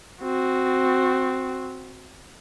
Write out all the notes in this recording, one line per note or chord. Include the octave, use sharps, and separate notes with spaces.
C4 F#4